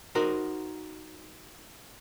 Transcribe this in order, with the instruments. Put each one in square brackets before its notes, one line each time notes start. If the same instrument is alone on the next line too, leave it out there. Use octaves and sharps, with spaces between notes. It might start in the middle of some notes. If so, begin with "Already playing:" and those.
[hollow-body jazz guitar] D#4 F#4 A#4 C5